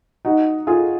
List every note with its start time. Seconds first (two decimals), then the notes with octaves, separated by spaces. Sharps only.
0.25 D#4 F#4
0.67 F4 G#4